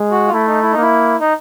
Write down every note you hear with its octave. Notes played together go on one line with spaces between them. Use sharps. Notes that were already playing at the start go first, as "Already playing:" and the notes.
Already playing: G#3
F#4
F4
A3 E4
D#4
E4
A#3 D#4
E4
D#4